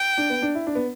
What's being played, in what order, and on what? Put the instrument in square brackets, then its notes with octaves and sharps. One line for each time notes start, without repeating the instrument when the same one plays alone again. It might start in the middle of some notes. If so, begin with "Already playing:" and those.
Already playing: [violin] G5
[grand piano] D4
B3
D4
E4
D4
B3